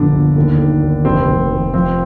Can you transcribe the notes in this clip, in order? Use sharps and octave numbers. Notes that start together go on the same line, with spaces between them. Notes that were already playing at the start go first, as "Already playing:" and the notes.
Already playing: G1 F2 A#2 D3 D4
G1
D#2
D#3
D#2
F1 C4
F1
F1
F3 C4